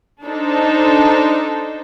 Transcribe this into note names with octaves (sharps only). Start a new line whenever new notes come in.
D4 D#4 A4 C5